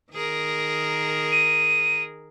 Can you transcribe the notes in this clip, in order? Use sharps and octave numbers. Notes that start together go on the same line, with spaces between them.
D#3 G#4 A#4
D#7